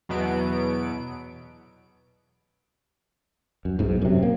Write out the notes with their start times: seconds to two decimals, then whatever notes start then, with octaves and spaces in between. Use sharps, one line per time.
0.09 E2 B2 F#3 B3 D7
3.65 F#2
3.79 B1 G#2
4.02 F#2 C3
4.23 A#3